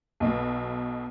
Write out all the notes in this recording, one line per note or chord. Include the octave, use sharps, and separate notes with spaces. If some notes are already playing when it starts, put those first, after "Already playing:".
B1 B2